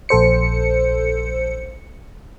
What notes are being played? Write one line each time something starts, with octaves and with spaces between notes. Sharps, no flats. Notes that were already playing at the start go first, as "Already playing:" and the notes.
A#1 A4 C5 C#7